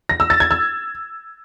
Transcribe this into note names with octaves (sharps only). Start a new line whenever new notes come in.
A#6
E6
A6
G#6
E6